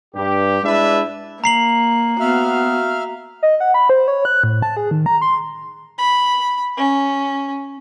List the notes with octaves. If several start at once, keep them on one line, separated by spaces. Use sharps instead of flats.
G2 G4
G#3 D4 E4 B4 D5 E5
A#3 A#5 C7 F#7
B3 F#4 E5 F5 F6
D#5
F#5
B5
C5
C#5
F#6
A2
A5
G#4
D#3
A#5
C6
B5
C#4